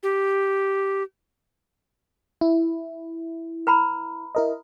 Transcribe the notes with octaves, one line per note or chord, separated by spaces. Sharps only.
G4
E4
B4 A#5 B5
E4 A#4 D#5